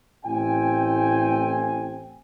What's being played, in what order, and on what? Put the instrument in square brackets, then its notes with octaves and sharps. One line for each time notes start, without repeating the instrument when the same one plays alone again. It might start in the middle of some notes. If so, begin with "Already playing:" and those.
[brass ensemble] A1 A2 C4 G5 G#5